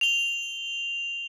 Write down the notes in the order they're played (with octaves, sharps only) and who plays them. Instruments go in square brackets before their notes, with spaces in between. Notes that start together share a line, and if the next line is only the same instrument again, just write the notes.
[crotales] F7 G7